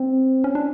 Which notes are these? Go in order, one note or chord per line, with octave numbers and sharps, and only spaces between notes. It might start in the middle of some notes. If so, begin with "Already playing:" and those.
Already playing: C4
C#4
D4